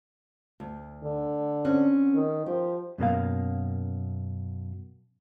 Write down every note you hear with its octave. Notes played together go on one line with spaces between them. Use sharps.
D2
D3
C4 C#4 F#5
D#3
F3 G4
F#2 B2 A#3 F5